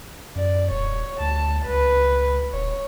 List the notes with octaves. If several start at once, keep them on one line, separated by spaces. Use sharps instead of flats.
F#2 D5
D#1 C#5
D2 A5
C#2 B4
D#1 C#5